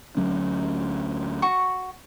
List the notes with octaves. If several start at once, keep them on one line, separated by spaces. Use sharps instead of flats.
D2 F#3 C#4
F#4 C#6